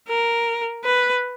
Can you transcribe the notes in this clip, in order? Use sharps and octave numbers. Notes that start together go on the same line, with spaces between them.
A#4
B4